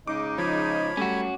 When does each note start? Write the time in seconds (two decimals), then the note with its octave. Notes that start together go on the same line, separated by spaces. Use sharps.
0.07 C#3 G#3 D#4 D6
0.38 F3 C#5 B5
0.97 G3 A3 C#4 F#4